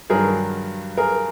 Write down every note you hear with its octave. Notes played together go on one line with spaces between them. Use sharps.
G2 D#3 F#3 G#4 A#4
G#4 A#4